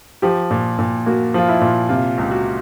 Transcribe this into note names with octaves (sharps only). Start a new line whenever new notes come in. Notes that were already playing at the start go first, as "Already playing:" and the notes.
F3 G4
A#2
A#2
A#3 F#4
F3 F4
E4
A#2
C3 F4
C#2
F#4